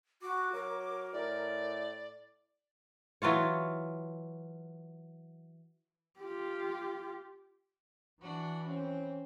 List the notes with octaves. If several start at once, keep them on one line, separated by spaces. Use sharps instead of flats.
F#4 D6
F#3 A#4
A2 D5
E3 F#3 F4 C#5
F4 G4
E3 D4 F#4
C4 C#4